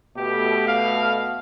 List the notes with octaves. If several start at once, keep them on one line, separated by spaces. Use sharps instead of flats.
B2 A3 G4
F5